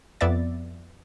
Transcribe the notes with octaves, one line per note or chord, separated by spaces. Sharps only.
F2 B3 D5 E5 A6